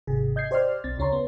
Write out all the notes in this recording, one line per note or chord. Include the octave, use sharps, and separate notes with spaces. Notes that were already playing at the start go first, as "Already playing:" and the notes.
G#1 C3 G#4
D#5 G6 G#6 C7
G4 C5 D5 D#5 C6 F6
B1 C4 A6
D2 C#3 C#4 C#5 A#5 C6
B3